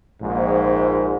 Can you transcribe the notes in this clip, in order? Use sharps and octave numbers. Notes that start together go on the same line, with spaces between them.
A#1 G#2